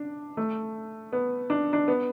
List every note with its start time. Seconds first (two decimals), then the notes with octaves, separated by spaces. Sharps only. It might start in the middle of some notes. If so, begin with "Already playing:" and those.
Already playing: D4
0.37 A3
1.12 B3
1.50 D4
1.73 D4
1.88 B3